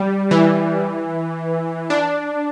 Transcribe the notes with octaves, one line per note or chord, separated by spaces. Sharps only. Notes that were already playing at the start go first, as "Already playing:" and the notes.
Already playing: G3
E3
D4